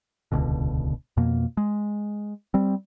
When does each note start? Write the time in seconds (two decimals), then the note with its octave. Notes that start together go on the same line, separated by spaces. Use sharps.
0.32 D#1 C#2 B2 D3
1.17 F2 B2 A#3
1.57 G#3
2.54 G3 C4